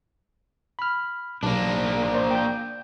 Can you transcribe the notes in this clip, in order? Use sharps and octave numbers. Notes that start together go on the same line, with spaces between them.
B5 F6
B1 A#3 D4
C5 D5 C6
G5 G6